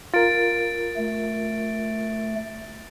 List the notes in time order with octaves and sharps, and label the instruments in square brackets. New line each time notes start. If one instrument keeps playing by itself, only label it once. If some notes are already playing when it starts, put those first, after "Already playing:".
[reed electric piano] F4 A#4 [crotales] A6 D7
[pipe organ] A3